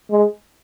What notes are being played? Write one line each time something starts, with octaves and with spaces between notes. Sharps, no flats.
G#3